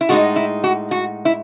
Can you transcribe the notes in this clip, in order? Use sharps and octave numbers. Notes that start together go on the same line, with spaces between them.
E4
A2 G#3 D#4 F#4
E4
F#4
F#4
E4